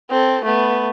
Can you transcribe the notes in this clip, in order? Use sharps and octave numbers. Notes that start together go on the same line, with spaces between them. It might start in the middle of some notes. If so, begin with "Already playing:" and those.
C4 A4
A3 B3